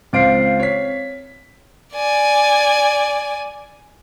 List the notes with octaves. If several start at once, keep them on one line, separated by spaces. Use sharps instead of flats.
C#2 C4 C5 F5 C7 D7
C#5 B6
D5 G#5